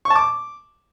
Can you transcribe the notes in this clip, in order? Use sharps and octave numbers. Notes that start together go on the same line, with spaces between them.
C#6
A5
D6